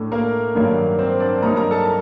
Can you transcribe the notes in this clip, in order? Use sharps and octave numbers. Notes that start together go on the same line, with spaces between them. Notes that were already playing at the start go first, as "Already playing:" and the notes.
Already playing: A2 A3 D4
A#3 A#4
G2 D#3 F#3 A#3
C4 C5
D4 D5
G2 F#3 A#3 D#4 A#4 A#5
A#4 A#5
A4 A5
A#5